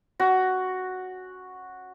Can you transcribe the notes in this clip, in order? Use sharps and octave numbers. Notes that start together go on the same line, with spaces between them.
C#4 F#4